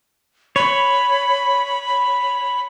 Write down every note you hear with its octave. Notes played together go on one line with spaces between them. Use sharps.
C#5 B5